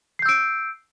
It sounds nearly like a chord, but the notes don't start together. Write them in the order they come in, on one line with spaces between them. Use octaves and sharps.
C7 G6 E6 D7